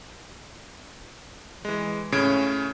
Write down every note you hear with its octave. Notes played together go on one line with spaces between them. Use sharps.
E3 G#3
A2 C#3 C#4 G#6 D7